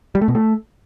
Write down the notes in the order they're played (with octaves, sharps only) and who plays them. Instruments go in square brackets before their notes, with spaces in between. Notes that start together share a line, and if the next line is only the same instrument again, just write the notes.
[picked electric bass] G3
A3
B2
A3